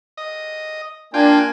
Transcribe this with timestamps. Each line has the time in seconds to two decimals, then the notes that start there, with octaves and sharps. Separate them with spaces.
0.17 D#5
1.14 A#3 D4 F4 G5 G#5